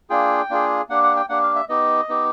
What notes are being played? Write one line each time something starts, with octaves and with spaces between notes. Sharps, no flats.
A#3 D4 F4 G#4 G5
A#3 D4 F4 G#4
A#3 D4 G4 F#5
F#5
G5
A#3 D4 G4 F#5
F5
E5
B3 D#4 G4 D#5
B3 D#4 G4